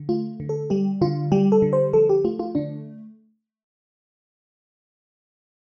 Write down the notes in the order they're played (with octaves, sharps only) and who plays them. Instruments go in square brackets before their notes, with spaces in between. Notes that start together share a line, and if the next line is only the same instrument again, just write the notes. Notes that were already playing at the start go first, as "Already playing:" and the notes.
Already playing: [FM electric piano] D3
A3 F4
D3
A4
G3 G4
D3 F4
G3 G4
A4
D3
C5
F3 A4
G4
A3 F4
F4
D3 D4